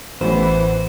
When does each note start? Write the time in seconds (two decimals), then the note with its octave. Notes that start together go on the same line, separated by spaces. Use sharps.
0.21 A1 E3 B3 C5